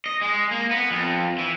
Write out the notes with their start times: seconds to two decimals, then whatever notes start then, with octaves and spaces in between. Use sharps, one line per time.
0.06 D#5
0.22 G#3
0.51 A#3
0.71 B3
0.91 F2
1.38 E3